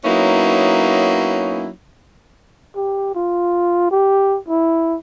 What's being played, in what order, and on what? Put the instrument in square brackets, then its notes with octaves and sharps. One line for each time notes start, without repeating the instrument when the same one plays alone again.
[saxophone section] F#3 A#3 B3 C#4 D#4 E4
[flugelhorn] G4
F4
G4
E4